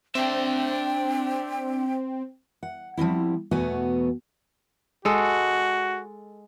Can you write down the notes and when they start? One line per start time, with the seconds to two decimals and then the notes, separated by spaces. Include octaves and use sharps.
0.15 C4 D4 E5 G5
2.63 F#5
2.97 F3 G3 C4 E4
3.51 E2 B2 A3 B3 F#4 G#5
5.05 G#3 F#4 A4